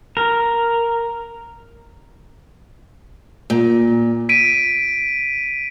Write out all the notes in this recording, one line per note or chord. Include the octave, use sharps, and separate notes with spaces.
A#4
A#2
B6 D7 D#7